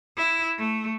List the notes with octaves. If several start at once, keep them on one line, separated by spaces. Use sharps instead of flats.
E4
A3